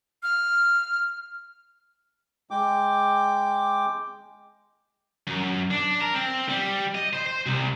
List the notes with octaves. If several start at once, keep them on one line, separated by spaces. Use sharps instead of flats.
F6
G#3 G5 D6
F#2
D4
A#4
C4
G3
D#5
C5
C5
C2